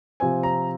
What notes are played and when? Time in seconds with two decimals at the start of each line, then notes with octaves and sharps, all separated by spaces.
0.20 C3 F3 C4 G#5
0.43 A#5